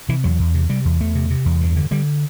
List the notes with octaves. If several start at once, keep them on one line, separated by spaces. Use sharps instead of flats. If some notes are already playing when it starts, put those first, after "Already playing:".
C3 E3
E2 F#3
E2
C3
C3 G3
E2
E2 A3
C3
C3
E2
G2
D3
D3 G3